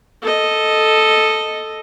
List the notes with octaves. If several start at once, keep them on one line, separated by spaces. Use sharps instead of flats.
A4 D#5